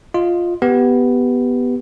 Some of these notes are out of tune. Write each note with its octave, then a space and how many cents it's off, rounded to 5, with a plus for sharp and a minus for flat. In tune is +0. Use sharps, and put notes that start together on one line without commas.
F4 +0 D#5 +0
B3 +0 G4 +0 B4 +0